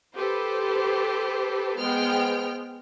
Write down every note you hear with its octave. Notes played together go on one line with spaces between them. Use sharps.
G4 A4 B4 C5
G#3 B3 C5 G5 F6